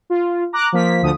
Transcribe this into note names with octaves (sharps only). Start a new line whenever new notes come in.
F4
A#5 D6 F#6
F3 A#3 B6
D2 D3 F3 D#6